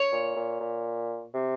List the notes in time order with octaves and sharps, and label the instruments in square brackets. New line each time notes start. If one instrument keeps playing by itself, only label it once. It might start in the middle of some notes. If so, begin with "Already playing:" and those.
Already playing: [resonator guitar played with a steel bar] C#5
[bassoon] A#2
A#2
A#2
C3